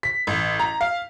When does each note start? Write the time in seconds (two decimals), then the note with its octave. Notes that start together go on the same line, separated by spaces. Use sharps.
0.03 B6
0.27 A1
0.60 A#5
0.81 F5